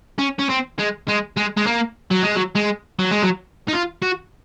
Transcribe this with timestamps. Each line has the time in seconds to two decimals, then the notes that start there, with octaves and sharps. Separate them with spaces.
0.18 C#4
0.39 C#4
0.49 C4
0.79 G#3
1.08 G#3
1.37 G#3
1.57 G#3
1.66 A#3
2.11 F#3
2.23 G#3
2.36 F#3
2.56 G#3
2.99 F#3
3.11 G#3
3.23 F#3
3.68 D#4
3.73 F4
4.02 F#4